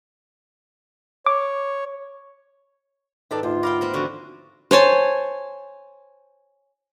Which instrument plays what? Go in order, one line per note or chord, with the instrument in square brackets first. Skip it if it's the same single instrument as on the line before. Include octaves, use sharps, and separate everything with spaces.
[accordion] C#5 [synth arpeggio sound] D6
[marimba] G#2 B4 D#5 [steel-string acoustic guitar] D#3 D4 A4
[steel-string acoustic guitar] D2 [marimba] D#4 [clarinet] F4
[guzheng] A#4 F5 G5 [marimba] B5 C6 D6
[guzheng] B3 C4 A#4
[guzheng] D3 F3 [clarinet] F#4
[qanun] C5 C#5 G#5 A5